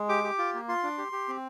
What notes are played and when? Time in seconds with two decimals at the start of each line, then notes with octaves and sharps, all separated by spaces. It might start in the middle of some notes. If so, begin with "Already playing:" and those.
Already playing: G#3
0.09 G4 D6
0.24 G4
0.38 F4
0.54 A#3
0.68 F4 C6
0.83 D4
0.98 G4
1.12 G4
1.28 C4